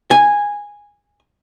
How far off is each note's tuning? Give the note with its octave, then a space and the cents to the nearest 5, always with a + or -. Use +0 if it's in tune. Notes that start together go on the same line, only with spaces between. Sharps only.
G#5 -10